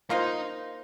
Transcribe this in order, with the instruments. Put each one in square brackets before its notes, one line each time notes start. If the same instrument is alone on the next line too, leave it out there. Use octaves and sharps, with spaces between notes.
[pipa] A#3 F4 C5 [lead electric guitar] D#4